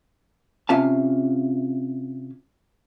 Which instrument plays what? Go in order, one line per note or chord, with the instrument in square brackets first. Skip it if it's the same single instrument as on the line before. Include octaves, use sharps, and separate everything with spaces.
[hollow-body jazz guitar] C3 C#4 F4 E5 F5 A5